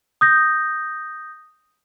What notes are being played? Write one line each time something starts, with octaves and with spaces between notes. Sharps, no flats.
D#6 G6 A#6